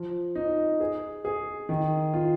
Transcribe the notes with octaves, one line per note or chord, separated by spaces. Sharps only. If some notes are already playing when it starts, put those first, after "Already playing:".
Already playing: F3
D#4
G#4
G#4
D#3
F4